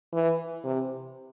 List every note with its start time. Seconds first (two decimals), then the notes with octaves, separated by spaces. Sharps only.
0.14 E3
0.64 C3